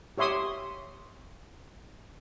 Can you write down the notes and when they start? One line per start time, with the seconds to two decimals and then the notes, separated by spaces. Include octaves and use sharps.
0.18 G4 C#5 E5 C6 D#6